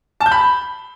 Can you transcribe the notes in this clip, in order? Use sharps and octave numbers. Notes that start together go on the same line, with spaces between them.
A5
G6
B5